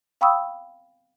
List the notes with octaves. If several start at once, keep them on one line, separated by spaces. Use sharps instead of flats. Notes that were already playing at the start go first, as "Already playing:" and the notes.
F5 G5 B5 C#6 D#6 E6